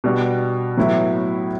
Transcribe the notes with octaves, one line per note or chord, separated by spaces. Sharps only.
B2 G3 D4 F#4
A2 F#3 B3 E4